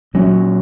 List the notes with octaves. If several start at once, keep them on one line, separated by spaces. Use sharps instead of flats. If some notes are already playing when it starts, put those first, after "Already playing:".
A#2 F#3 C#4